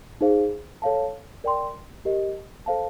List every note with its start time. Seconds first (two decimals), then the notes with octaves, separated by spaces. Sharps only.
0.21 D#4 G#4 C5 F5
0.82 A4 C#5 F5 A5
1.44 A#4 D5 G5 C6
2.05 G4 A#4 D#5
2.66 A4 C5 F5 A5